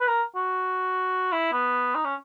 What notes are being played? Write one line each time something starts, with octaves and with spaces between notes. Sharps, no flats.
B4
A#4
F#4
E4
B3
D#4
C#4